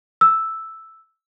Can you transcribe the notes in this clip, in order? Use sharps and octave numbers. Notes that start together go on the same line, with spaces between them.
E6